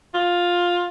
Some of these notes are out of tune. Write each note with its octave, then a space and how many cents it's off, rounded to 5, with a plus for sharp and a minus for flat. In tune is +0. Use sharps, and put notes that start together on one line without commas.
F4 +10